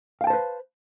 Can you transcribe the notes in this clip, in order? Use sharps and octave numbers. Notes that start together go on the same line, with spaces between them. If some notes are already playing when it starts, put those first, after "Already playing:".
B4 C5 F5 G5 A5